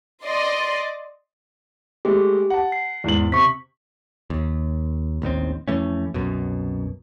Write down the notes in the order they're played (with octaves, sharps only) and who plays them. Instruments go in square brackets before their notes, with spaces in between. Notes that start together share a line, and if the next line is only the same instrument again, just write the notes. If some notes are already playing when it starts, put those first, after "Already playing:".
[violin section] D5 D#5 C6
[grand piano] G#3 A3 [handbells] G4
[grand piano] F#5 A5
[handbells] C7
[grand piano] E2 G#2 F#7
[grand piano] C3 [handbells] C#6 B6
[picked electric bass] D#2
A1 D#2 D#3 C4
F2 E3 A3 C#4
C2 F#2 B2